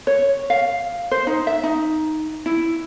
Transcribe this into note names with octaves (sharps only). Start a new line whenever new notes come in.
C#5
F5
C5
D#4
E5
D#4
E4